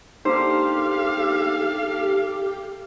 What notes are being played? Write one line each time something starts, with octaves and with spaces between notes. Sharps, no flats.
A#3 D4 D#4 G4 A4 C5 F5